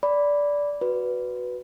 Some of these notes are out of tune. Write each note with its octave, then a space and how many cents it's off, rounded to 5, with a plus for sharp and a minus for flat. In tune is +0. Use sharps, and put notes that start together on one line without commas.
D5 -15 B5 +0
F#4 +0 B4 +0